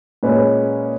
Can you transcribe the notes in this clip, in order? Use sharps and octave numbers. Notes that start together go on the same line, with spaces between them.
A#2 G#3 C#4 B4